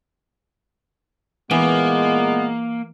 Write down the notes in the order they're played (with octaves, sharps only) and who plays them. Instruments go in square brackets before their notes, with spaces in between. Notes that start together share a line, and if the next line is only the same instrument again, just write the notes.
[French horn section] A#2 G#3 [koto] E3 [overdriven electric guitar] A#3 [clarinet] B3